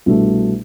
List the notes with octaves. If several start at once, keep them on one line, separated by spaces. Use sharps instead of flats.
C2 B2 A3 D4